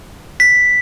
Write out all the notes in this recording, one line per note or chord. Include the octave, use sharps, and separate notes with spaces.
B6